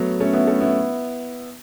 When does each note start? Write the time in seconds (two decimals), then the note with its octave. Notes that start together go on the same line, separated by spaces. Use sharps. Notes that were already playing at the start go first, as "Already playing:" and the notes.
Already playing: F#3 A3 B3
0.20 A3 C#4
0.33 B3 E4
0.47 A3 C#4
0.61 B3 E4